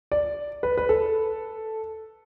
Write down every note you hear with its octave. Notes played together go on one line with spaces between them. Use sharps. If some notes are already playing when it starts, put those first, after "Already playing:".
D5
B4
B4
A4